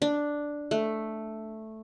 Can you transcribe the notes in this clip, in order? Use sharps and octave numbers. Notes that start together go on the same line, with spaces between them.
D4
A3